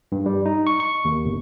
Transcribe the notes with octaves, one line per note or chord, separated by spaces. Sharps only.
G2
G3
D#4
C#6
C#6
D#2
G1